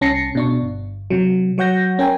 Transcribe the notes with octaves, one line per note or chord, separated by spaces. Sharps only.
C2 C#4 A5 A#6 C7 C#7
B2 D4 C#6
G1
C3 F#3
F#3 C#5 F#5 G6 A#6
C#4 A#4 G5 G#5